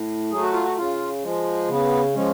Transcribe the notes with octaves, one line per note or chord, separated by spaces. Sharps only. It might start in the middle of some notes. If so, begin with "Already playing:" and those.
Already playing: A2
F#3 A3 G#4
F#4
F4
F#4
C#3 F4
F3 G#3
C#3 B3
F3 G#3 C#4